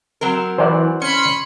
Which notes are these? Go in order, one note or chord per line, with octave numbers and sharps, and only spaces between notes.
F#3 C4 A#4
E3 C5 D5 F#5
C#4 B5 C6 C#7